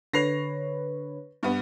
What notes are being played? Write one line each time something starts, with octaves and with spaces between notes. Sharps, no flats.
D3 B4 C#5 A#6 C7 F7
G2 B3